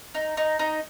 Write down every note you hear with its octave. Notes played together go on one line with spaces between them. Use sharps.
D#4
D#4
D#4